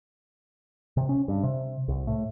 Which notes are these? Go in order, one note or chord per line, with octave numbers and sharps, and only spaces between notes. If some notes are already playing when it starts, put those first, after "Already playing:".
C3
C#4
G2
C3
C2
A2